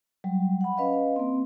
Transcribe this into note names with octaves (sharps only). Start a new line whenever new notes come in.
F#3 G3
F#5 B5
C#4 B4 D#5 F5
A#3 C4